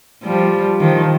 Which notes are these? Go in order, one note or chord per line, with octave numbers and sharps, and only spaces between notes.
F3 G3
D#3 F3